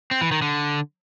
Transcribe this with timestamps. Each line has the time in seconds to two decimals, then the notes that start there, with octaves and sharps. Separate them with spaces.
0.11 C4
0.21 E3
0.32 D#3
0.42 D3